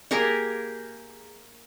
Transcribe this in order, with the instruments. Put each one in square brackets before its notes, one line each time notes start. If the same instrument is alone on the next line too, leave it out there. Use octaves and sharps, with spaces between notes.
[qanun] A#3 G4 G#4 A#4